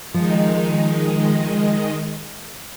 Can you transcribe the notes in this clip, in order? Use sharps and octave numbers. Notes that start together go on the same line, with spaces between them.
D#3 F3 G#3 D#4